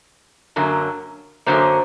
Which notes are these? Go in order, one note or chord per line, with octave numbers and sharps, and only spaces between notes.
F#2 D3 F#3 A#3
F#2 D3 F#3 A#3 C5